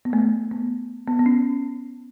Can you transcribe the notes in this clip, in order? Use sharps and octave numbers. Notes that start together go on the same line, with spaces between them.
B3
A3
B3
B3
B3
C#4